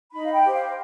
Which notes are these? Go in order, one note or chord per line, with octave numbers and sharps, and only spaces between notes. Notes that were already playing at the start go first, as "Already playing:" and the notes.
D#4 B5
F5
G5
G4 C5
F5